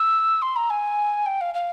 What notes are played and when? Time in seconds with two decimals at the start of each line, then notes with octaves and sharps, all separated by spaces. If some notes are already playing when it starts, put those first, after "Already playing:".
Already playing: E6
0.41 C6
0.55 A#5
0.69 G#5
1.25 G5
1.40 F5
1.54 F5